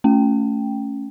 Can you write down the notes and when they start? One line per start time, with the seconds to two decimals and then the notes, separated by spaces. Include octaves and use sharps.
0.04 A3 C#4 G5